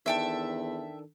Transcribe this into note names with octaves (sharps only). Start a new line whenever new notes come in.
E2 D#3 D4 A4 E5 G5 A5